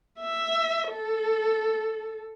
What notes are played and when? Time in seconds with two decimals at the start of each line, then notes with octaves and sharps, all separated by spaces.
0.19 E5
0.88 A4